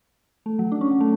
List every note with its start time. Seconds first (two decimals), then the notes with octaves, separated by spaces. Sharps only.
0.46 A3
0.59 F#3
0.72 D4
0.81 C#4
0.91 F#3
1.00 A3